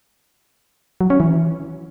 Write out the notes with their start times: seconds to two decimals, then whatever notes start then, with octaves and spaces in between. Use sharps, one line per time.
1.01 F#3
1.10 C#4
1.20 E3